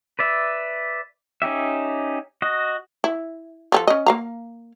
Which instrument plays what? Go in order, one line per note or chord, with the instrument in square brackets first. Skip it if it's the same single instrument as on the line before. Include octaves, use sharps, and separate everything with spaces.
[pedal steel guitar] B4 D5 E5
C#4 D#4 G4 E5
F#4 D#5
[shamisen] E4
F3 G4 A4
C#4 D#5
A#3 F5 A#5